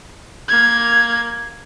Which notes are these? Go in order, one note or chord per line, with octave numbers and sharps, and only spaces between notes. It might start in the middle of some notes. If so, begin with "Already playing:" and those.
A#3 G#6